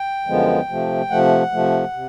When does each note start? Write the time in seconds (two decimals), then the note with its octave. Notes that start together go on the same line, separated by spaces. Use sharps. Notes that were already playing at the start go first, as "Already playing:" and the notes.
Already playing: G5
0.27 F#2 D3 F3 G#3 B3
0.69 C3 F3 A3
1.10 C3 F3 A3 F#5
1.52 C3 F3 A3
1.93 C3